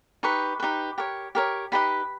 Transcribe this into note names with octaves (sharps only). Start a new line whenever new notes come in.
D#4 G4 B4 C#6
D#4 G4 B4
G4 A#4 C#5
G4 A#4 C#5
D#4 G4 B4 D#5 B5